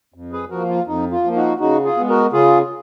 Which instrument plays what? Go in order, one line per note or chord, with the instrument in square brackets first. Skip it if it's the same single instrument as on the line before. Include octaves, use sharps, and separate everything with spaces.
[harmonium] F2
G#4 B4
F3 A#3 F#4 A#4
F4
F2 D#4
F4
F3 A#3
D#4 F#4
C#3 D#4 F#4
F4 G#4
G#3 B3
F#4 A#4
C#3 F4 G#4